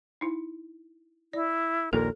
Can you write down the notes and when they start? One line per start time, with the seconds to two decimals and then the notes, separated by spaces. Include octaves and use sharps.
0.21 D#4 E4
1.33 E4 D5
1.93 A#1 D#2 A#2 A4 A#4